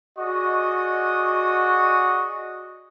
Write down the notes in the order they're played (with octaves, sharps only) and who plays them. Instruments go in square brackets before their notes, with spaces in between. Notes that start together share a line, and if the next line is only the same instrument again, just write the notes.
[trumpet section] F#4 G#4 D5 D#5 C#6 D#6